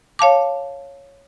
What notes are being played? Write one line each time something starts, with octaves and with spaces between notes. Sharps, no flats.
C#5 F5 A5 D6